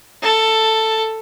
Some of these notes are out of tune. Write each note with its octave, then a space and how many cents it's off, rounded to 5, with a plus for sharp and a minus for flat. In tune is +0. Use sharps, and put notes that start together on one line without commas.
A4 +10